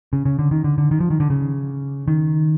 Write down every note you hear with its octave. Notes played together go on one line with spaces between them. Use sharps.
C#3
C#3
D3
D#3
D3
D3
D#3
F3
D#3
D3
C#3
D#3